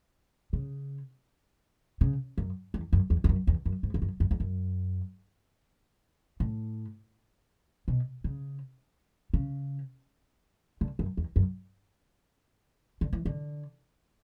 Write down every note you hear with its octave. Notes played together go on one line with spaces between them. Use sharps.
C#3
C#3
F#2
E2
F#2
E2
E2
F#2
E2
F#2
G#2
E2
F#2
F#2
E2
F#2
A2
B2
C#3
C#3
D3
F#2
E2
F#2
D3
E3
D3